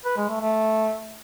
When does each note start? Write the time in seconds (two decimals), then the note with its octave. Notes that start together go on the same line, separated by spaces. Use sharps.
0.05 B4
0.17 G#3
0.29 A3
0.41 A3